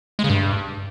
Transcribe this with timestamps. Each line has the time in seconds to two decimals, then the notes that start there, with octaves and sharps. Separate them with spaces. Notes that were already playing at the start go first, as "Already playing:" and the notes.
0.19 G#3
0.24 C#3
0.29 G2